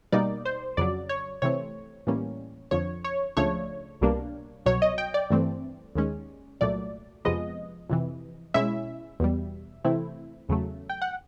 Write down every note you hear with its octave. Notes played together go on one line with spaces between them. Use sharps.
B2 G3 A#3 D#4 D5
C5
F2 C#3 F#3 D5
C#5
C3 E3 A3 C4 C#5
A2 E3 G3 A#3 C#4
F2 D3 F3 C#5
C#5
C#2 C#3 F3 A3 D4 C#5
C2 B2 G3 A#3 D4
C2 B2 F#3 C#5
D#5
G5
D5
G2 E3 A3 C4
D#2 D#3 G#3 C#4
C2 A#2 F#3 A3 D5
F2 C3 F3 G#3 B3 D#5
F2 C3 E3
B2 G#3 C#4 E4 E5
E2 B2 G3
C3 E3 A3 C4 E4
E2 C#3 F#3 A3
G5
F#5